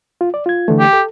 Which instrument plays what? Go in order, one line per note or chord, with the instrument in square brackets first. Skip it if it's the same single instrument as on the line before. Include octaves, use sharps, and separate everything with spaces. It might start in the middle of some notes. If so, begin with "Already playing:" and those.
[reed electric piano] F4
D5
F4 G#6
D3 E3 A3
[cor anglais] G4
[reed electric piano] A4